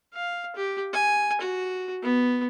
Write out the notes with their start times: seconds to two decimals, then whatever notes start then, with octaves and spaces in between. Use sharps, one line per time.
0.14 F5
0.56 G4
0.93 G#5
1.41 F#4
2.03 B3